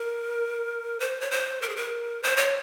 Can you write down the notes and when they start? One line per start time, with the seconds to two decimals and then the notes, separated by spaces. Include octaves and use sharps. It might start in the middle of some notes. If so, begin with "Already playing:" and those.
Already playing: A#4
1.00 C5
1.21 C#5
1.31 C5
1.62 A#4
1.69 G#4
1.76 A#4
2.23 C5
2.37 C#5